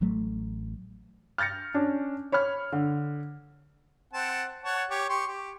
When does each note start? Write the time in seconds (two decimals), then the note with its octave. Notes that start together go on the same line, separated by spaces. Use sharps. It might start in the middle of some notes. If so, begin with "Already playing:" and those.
0.01 A1 F#3 A3
1.38 F6 G6 A6 A#6 C#7
1.74 C#4 D4
2.32 C#5 B5 C#6 F6
2.72 D3
4.13 C4 F#5 A5
4.64 C#5 F#5 A5
4.90 G4 C#5
5.09 G4 C6 C#6
5.27 G4